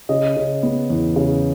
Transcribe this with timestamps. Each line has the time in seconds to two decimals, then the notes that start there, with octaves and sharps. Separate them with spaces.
0.09 C#3 D#5
0.36 C#3
0.63 B3
0.90 E2
1.16 C#3